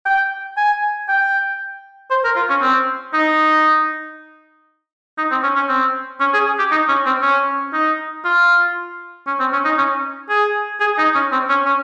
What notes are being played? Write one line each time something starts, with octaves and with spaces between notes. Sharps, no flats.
G5
G#5
G5
C5
A#4
F4
C#4
C4
D#4
D#4
C4
C#4
C#4
C4
C#4
G#4
G4
D#4
C#4
C4
C#4
D#4
F4
C#4
C4
C#4
D#4
C#4
G#4
G#4
D#4
C#4
C4
C#4
C#4